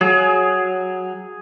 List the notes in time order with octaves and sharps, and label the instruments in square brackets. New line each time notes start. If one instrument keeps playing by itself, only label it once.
[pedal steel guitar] F#3 [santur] G#4